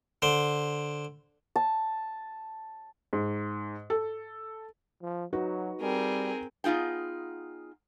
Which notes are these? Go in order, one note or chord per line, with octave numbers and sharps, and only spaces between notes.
D3 C5
A5
G#2
A4
F3
F#3 D#4 F#4 B4
G3 C4 G#4 A#4
B3 D#4 F4 G#4 G5